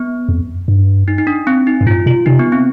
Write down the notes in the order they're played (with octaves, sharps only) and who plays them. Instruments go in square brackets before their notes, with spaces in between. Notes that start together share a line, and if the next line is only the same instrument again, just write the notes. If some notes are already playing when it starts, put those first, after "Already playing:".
Already playing: [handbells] B3
[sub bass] F2
G2
[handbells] D#4
D#4
D4
C4
D#4
[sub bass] G2
[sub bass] G#2 [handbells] F4
[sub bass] B2 [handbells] F4
[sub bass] C3 [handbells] D#4
[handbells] B3
C4